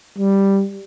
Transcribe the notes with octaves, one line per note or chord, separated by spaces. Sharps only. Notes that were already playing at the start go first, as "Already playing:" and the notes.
G3